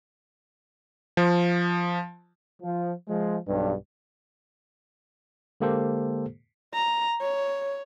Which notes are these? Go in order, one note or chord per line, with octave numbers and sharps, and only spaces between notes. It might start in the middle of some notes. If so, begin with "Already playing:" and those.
F3
F3
F3 G#3
B1 G2
D3 G#3 A#3 G4 A4 C5
A#5
C#5